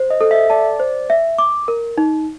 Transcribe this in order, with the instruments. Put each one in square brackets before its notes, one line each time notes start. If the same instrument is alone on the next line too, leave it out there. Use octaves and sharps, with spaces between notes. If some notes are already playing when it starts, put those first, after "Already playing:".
Already playing: [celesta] C5
[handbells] D#5
[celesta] A4
[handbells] E5
[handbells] D5 [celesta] A5
[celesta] C5
E5
D6
A#4
D#4